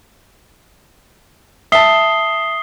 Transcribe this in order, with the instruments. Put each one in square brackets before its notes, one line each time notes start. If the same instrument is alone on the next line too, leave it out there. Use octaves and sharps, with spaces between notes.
[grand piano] E5 A5 [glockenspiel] D#6 C7 G7